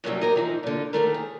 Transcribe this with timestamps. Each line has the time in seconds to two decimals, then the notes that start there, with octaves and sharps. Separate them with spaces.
0.04 F#2 A2 C3 E3 F#3 G3
0.21 G4 A#4 D#5
0.35 E3 F3 D#4
0.63 A#2 D3
0.93 D#2 D#3 A3 A#4
1.14 G#4